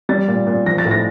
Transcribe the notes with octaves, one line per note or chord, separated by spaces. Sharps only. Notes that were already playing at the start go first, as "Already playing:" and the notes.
G3 A6
A#2
A#2
F3 A#6
A6
A2
A#6